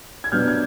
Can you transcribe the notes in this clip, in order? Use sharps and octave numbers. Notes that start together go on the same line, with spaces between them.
G#6
B2 F#3 B3 D4 F6 G6
G#6